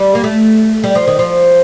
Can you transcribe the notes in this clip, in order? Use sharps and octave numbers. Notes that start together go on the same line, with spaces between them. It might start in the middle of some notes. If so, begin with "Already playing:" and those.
Already playing: G3
A#3
A3
G3
F3
D#3
F3